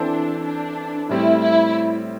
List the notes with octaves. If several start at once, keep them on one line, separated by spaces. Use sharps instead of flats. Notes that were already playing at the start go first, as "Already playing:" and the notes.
Already playing: E3 C4 D4 A4 C5
D4
A2 G3 C4 E4
E4